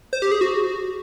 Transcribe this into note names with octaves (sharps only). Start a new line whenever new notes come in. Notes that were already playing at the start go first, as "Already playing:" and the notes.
C5
G4
G#4
F#4